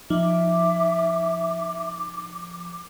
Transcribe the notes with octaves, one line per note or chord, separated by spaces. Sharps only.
F3 D#4 E5 D6